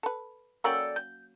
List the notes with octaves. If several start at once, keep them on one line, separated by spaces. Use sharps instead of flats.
A4 B4
F#3 A#3 C#4 A4 D5 G5
G6